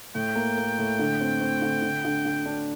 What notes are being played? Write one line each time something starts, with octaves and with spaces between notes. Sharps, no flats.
A2 G5
A#3
A#3
A2
D3
C4
C4
D3
D3
D3
D3
D4